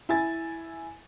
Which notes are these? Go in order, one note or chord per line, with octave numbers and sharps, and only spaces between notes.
E4 G#5 A6